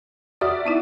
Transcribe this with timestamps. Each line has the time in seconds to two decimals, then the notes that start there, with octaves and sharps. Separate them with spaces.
0.41 F#4 D5 E5 D#6 F6
0.65 B3 D#4 E4